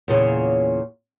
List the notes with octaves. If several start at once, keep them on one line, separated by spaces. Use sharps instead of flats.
E2 A#2 C#3